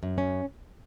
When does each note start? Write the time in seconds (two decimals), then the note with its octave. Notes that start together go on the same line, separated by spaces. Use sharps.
0.03 F#2
0.18 C#4